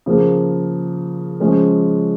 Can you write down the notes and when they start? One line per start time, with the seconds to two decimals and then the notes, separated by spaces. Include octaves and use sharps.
0.06 C#3 F3 A#3
1.40 C#3 F3 G#3 C#4 G#4